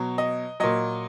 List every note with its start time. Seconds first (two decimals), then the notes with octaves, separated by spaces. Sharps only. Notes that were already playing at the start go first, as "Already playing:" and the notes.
Already playing: B2 F#3
0.18 D#5
0.60 A#2 F#3 D#5